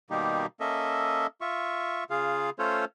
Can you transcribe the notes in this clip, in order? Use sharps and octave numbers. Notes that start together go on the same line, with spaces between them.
B2 D#3 G3 A#3 D#4 G4
A#3 C#4 A4 D#5 E5
F4 E5 C#6
C#3 F4 G#4 F5
A3 C#4 F4 A4 C5 C#5